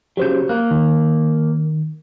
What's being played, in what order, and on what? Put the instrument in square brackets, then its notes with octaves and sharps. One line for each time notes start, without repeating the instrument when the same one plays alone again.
[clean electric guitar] C#3 F#3 [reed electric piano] G4 C5 G6
[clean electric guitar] A#3 [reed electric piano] F#6
[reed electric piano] D#3